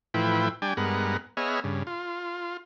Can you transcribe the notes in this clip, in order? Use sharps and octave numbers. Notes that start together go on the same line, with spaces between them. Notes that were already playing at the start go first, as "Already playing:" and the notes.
A2 E3 F3 E4 B4 G5
G3 D4 G5 G#5
G2 G#3 B3 A#4 F#5
B3 G#4 C#5 D#5 E5 F6
G2 C#3
F4